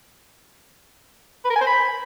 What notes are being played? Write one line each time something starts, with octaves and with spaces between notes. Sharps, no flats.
B4
A#4
G#5
C5
B5